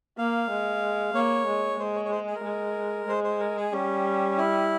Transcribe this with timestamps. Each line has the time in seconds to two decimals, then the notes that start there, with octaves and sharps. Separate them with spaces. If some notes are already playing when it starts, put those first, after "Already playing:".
0.18 A#3 F5
0.50 G#3
1.14 A#3 C#5
1.47 G#3
1.79 G#3 C5
1.95 C#5
2.05 C#5
2.11 C5
2.27 G#4
2.35 A#4
2.44 G#3
3.08 G#3 C5
3.24 C5
3.40 A#4
3.56 G#4
3.72 G3 C#4
4.37 E4